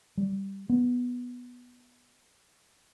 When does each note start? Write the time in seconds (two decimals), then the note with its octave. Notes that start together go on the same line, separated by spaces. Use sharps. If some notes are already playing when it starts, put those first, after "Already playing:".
0.17 G3
0.69 B3